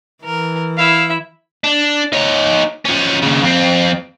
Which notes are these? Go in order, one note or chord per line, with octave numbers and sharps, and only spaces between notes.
E3 A#4
E4 E5 F5
D4
D#4 C#5
F3 C#4
D#2 C#3
F2 C4